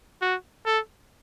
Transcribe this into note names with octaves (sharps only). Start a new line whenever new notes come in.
F#4
A4